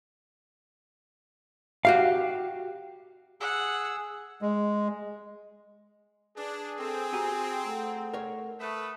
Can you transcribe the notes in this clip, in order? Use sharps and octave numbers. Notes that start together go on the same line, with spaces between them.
F#4 G4 F5
G#4 F#5 E6
G#3
D4 G#4 B4
C4 A4 B4 G#5
F#4 G4 G#5 A#5
A3 A4 F#5
A#4 C#5
A3 B4 D#6